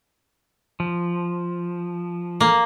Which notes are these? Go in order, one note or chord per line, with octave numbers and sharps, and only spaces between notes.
F3
A#3